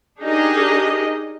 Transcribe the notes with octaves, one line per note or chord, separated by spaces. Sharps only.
D4 D#4 G4 G#4 A#4 D#5